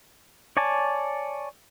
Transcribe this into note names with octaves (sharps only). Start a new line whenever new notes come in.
C#5 D5 G#5 A5